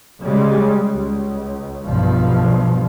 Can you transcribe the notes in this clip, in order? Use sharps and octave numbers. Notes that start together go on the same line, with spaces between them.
C#3 G3 G#3
C#2
B1 G2 B2 F3